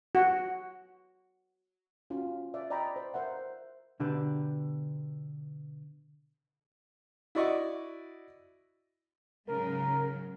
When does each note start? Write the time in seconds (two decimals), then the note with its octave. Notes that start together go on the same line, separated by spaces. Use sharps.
0.15 F#4
2.10 C#4 F4 F#4
2.54 D5 E5
2.70 D5 D#5 G5 A#5 B5
2.96 C5
3.14 A#4 C5 E5 F#5
4.00 B2 D3 D4 G4 B4
7.35 E4 F#4 D5 D#5 C#6
9.48 G#2 C#3 F#3 A#4